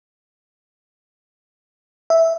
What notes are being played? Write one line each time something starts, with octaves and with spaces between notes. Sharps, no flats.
E5